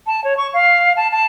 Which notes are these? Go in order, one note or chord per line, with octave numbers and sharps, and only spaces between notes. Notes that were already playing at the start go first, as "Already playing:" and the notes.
A5
C#5
C#6
F5
A5
A5